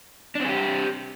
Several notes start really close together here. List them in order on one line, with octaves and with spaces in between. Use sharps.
D4 C4 G#4 G4